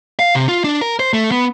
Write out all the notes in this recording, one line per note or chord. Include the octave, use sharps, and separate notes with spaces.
F5
C3
F4
D4
A#4
C5
A3
B3